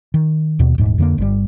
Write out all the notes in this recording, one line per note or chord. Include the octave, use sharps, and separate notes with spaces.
D#3
D#2 B2
D#1 G#2
F2 D3 G3 A#3
G1 G3